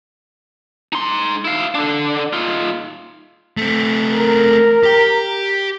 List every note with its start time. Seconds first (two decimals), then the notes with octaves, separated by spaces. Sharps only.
0.93 D#4 C6
1.45 E4 F5
1.75 D3 D4
2.33 D#4 F4
3.57 A3 C4
4.13 A#4
4.83 G4 G5